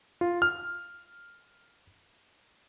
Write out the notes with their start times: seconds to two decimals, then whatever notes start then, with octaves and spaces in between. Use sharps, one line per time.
0.21 F4
0.42 F6